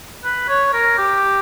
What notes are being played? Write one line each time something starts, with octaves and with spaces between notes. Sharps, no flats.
B4
C#5
A#4
G4